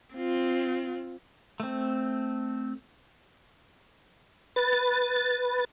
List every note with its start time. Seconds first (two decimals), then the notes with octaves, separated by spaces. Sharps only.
0.14 C4 F4
1.60 A3 C4
4.56 B4 A6